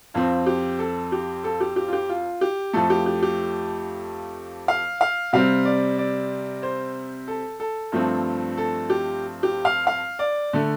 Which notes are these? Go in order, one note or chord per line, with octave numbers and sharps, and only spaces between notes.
F2 F3 C4 F4
G4
A4
G4
A4
G4
G4
F4
G4
F4
G4
F2 F3 A3 A4
G4
G4
G4
F5
F5
C3 G3 C4 F5
D5
D5
C5
A4
A4
G2 F3 A3 C4
A4
G4
G4
F5
F5
D5
D3 A3